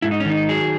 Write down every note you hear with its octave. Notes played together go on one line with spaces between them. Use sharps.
G#2 E4
D#4
C#4
D#3 D#4
F#3 G#4